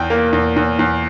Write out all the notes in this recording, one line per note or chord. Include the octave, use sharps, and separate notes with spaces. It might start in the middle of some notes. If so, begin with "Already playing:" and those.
Already playing: E2 G5
A#3
E2
E2
E2